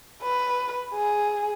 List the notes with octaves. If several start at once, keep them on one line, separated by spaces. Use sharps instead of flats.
B4
G#4